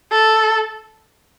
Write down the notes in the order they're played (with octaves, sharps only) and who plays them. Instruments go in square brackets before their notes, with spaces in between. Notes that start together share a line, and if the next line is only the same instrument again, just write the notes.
[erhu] A4